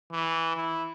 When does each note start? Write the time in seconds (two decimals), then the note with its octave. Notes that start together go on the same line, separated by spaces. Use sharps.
0.12 E3
0.56 E4